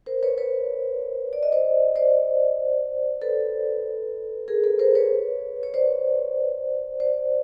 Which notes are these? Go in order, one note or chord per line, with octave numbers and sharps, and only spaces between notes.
A#4 C5
B4 C#5
B4 C#5
D5
D#5
C5 D5
C5 D5
A4 B4
G#4 A#4
A4 B4
A#4 C5
B4 C#5
C#5
C5 D5
C5 D5